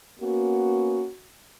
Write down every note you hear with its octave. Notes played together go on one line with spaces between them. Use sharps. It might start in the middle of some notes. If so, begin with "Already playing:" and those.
A#3 B3 C#4 F#4